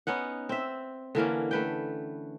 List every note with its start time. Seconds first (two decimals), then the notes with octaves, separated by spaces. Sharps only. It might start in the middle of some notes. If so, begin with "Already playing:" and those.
0.07 B3 C#4 D#4 F#5
0.49 C4 E5
1.15 D3 E3 A#3 C#4
1.51 A3 B4 G5